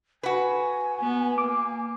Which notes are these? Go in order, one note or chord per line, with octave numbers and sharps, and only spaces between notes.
F#4 B4 G#5
B3
A#3 D6